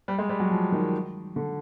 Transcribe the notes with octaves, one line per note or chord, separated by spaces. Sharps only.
G3
G#3
G3
F#3
F3
D#3
D3